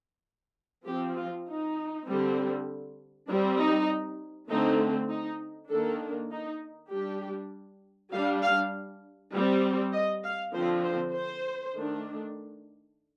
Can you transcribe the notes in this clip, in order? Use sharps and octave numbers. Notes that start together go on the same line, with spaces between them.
F3 C4 G4
F4
D#4
D3 G3 C4
G3 C4 D4
D#4
D3 A3 C4 D#4
D#4
D#3 A#3 D4 A4
D#4
G3 D4 G4
G3 D4 F5
F5
G3 C4
D#5
F5
D3 F3 C4 C5
C5
C5
D#3 A3 D4